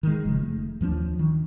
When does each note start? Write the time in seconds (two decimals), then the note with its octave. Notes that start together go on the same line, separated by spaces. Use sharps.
0.03 D#3 G#3
0.25 F1 C#3 F3
0.43 A3
0.81 D#2 F3 B3 D4
1.19 D#3